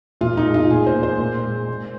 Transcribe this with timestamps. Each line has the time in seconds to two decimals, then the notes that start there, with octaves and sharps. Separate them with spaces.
0.21 A#2 F4
0.37 D#4
0.45 G#3
0.54 F4
0.70 A#2 G#4
0.87 C5
0.95 A#3
1.03 C5
1.19 A#2
1.44 G#3
1.68 A#2